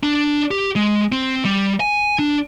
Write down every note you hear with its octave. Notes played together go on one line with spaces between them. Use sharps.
D4
G4
G#3
C4
G3
G#5
D4